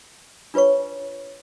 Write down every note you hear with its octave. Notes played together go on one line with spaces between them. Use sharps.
D4 F4 B4 C#5 C#6